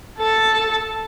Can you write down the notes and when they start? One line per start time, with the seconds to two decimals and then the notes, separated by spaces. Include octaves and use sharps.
0.19 A4 A5